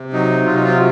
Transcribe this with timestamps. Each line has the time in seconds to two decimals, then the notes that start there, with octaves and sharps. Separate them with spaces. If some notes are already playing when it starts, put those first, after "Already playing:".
Already playing: C3
0.13 F#3 D#4
0.45 C3 F4
0.54 D#4
0.64 F4